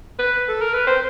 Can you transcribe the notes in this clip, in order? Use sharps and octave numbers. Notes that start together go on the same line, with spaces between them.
B4
A4
A#4
B4
C5